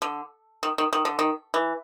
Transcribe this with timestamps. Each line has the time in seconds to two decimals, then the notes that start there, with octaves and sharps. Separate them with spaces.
0.02 D3
0.63 D#3
0.78 D#3
0.93 D#3
1.05 D3
1.19 D#3
1.54 E3